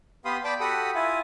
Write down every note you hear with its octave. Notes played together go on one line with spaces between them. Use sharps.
B3 G4 F5 B5 C6 D#6
D5 G5 A5 B5 D6
F#4 G4 A4 F#5 B5 D#6
E4 F4 G#5